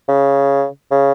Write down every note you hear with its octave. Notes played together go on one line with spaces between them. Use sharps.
C#3
C#3